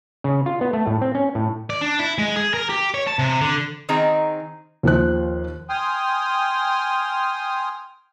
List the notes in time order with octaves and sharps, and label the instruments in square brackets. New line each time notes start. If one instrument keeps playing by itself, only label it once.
[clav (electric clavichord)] C#3
F4
B3
A3
A2
C4
C#4
A2
[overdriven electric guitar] D5
D4
E4
G#3
G#4
A#4
G4
C#5
A5
C3
D3
[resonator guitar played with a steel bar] D#3 C4 D#4 G#4 A#5
[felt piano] D#2 F3 C5 F#6
[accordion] G5 G#5 C6 D#6 F6